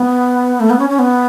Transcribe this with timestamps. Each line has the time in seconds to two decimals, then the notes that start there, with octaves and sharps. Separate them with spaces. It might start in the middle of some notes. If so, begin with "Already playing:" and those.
Already playing: B3
0.60 A3
0.70 B3
0.79 C#4
0.89 C#4
0.99 B3